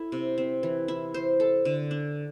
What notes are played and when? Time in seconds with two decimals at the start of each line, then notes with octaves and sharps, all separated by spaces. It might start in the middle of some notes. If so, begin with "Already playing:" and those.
Already playing: E4 A4
0.12 C3
0.38 C4
0.63 E3
0.88 E4
1.14 C5
1.40 A4
1.65 D3
1.91 D4